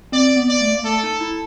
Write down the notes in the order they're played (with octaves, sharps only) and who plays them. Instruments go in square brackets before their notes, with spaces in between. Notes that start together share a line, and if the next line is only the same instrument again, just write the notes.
[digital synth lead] C4 [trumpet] D5
[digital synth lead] B3
[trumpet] D5
[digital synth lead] A3
A#3
[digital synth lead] A3 [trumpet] A4
[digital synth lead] D#4
E4